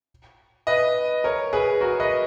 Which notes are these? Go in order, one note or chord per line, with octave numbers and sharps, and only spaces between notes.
B4 D#5
A#4 C#5
G#4 B4
F#4 A#4
B4 D#5